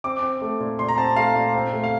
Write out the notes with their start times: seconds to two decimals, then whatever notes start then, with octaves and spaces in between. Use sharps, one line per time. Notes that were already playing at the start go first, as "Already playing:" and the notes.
0.04 C4 D6
0.23 C4
0.41 A3
0.60 A#2
0.79 A#2 C6
0.88 A#5
0.98 C4 A5
1.16 A3 F5
1.36 A#2
1.54 C4
1.73 A3
1.84 F5